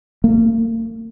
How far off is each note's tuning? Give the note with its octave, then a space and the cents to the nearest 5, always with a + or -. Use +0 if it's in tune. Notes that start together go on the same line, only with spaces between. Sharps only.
A#3 -40